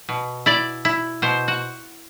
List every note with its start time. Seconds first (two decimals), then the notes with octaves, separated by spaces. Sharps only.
0.09 B2
0.46 E4 D5
0.85 E4
1.22 B2 C5
1.48 F#4